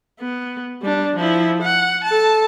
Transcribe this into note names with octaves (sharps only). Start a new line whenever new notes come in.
B3
G3 D4
F3 E4
F#5
A4 A5